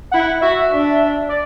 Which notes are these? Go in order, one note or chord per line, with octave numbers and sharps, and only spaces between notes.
E4 F#5
F#4 E5
D4
D5